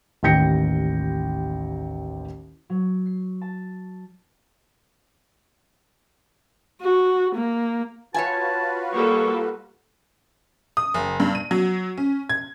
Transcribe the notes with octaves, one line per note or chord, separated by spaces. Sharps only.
A1 D#2 G5 G6 A#6 C#7
F#3
C7
A5
F#4
A#3
F4 F#4 B4 C#5 E5 G#5 A5
G3 A#3 A4 C#6
D#6
F#1
G2
D#7
F#3
C#4
G#6